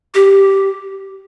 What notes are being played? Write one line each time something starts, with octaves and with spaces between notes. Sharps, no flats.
G4